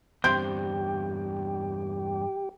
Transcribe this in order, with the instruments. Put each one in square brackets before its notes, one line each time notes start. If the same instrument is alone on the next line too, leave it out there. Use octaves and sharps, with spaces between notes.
[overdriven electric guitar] E2 G2 [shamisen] C4 [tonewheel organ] G4 [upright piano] G6